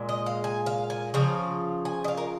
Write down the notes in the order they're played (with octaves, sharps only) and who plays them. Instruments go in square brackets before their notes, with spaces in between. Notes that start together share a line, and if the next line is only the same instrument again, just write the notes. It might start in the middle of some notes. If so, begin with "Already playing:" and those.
Already playing: [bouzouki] A#2 G#3
D#5
F5
G#5
F5
G#5
C#3 F3 F5
G#5
D#5
F5
A#4